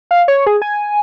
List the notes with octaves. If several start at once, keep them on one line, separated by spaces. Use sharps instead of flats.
F5
C#5
G#4
G#5